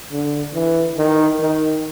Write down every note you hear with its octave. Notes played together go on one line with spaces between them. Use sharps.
D3
E3
D#3
D#3